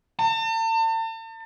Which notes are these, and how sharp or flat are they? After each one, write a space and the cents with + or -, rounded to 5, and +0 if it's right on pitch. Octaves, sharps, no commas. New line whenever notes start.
A5 +40